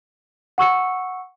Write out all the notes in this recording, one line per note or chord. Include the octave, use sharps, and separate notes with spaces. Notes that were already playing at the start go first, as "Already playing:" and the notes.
F#5 C#6 E6 C#7